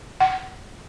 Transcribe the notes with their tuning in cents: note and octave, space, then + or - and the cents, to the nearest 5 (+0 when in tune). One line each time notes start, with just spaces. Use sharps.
F#5 +20